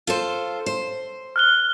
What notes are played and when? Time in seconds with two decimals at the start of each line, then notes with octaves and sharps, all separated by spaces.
0.07 F4 A4 C5
0.66 C5
1.36 F6 F#6 G7